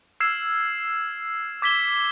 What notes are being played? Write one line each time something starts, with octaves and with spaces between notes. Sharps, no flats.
E6 F6 G#6 C7 E7
D6 G#6 B6 E7 G7